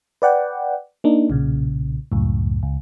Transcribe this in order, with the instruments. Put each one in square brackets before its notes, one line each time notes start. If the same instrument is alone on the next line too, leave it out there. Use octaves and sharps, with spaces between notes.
[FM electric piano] B4 D5 F#5 G5
A#3 D4 D#4
B1 A#2 C#3
C#2 F#2 A2
C#2